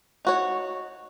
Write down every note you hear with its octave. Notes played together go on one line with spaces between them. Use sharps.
D#4 F#4 C#5